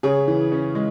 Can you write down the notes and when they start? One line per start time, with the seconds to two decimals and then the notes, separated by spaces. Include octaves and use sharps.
0.03 C#3 G#4 C#5
0.28 E3
0.52 C#4
0.75 G#3